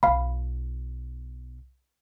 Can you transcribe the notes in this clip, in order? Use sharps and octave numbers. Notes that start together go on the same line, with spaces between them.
B1 F4 F5 B5